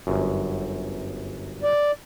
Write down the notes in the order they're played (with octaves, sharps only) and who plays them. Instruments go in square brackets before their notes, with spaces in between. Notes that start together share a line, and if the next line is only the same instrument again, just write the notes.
[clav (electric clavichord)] G1 F#2
[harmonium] D5